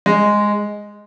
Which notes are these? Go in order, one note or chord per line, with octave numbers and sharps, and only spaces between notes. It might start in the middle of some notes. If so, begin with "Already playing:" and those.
G#3